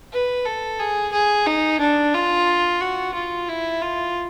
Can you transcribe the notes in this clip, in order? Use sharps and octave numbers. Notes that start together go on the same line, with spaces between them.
B4
A4
G#4
G#4
D#4
D4
F4
F#4
F4
E4
F4